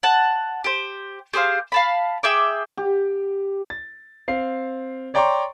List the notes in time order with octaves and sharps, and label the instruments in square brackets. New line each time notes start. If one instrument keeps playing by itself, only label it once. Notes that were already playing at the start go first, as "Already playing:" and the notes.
[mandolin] F#5 A5
G4 C5
G4 G#4 C5 F5
F5 A5 B5
G#4 E5 G5 D6
[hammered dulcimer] G4
[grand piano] A6
C4 F5 C7
C#5 D5 G5 A#5 C6 C#6